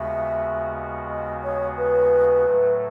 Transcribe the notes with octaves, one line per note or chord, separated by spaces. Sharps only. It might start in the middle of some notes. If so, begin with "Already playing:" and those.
Already playing: D#2 C#3 G#3 B3 F#4 E5
D#5
C#5
B4
A2 F#3 A3